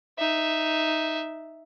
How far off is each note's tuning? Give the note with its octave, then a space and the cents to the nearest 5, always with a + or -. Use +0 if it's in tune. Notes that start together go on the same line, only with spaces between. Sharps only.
D#4 +0 E5 +0